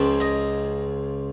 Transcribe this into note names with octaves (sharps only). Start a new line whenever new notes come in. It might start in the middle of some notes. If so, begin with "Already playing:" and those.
Already playing: C#2 C#3 F3
D#5